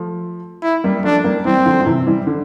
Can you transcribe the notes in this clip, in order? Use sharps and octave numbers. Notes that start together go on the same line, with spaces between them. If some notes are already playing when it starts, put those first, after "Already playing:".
Already playing: F3 A3
E4
G3 A#3
F3 A3 D4
G3 A#3
E3 G3 C4
D3 F3
F3
C3 E3
E3 G3
D3